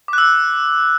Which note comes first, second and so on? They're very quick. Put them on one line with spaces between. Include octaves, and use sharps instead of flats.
D6 F#6 E6